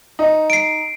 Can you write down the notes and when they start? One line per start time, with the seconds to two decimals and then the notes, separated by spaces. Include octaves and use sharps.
0.19 D#4
0.50 C7 D7